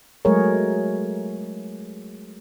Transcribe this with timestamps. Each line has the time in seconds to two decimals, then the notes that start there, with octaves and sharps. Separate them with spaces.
0.25 F#3 G#3 A3 G#4 A#4 C#5